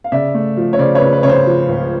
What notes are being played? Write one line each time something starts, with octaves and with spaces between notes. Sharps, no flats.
F5
C#3 D5 E5
A3
F3
C#5
C#3 C5 D5
B4 C#5
C#3
B4
C#3 C#5
C5
F3
C#2